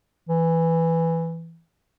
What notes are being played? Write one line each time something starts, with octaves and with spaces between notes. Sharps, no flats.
E3